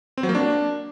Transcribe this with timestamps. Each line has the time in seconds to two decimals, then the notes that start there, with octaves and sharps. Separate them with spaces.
0.18 C4
0.23 F#3
0.29 A#3
0.35 D4